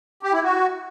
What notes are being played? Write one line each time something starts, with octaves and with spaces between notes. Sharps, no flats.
G4
E4
F#4